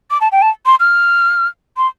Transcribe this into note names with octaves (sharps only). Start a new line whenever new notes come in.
D6
A5
G5
A5
C6
F6
C6